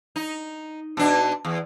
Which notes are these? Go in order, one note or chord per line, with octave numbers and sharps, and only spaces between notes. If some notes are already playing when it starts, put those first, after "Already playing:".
D#4
B2 D4
E2